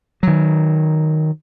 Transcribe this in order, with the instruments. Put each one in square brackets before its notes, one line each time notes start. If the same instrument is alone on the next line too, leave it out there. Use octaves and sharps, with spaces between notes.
[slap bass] D#3 F#3